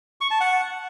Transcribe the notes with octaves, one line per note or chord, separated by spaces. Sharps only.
C#6
A5
F#5